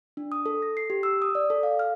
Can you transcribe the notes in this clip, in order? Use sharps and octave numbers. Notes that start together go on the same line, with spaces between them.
D4
D#6
A4
A#6
C7
G4
E6
D#6
D5
A4
F5
F6